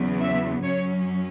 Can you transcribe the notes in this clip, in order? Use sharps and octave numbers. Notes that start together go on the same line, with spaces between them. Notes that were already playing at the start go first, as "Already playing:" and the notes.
Already playing: E2 C#3 F#3 B3
E5
F#2 F#3 C#4 C#5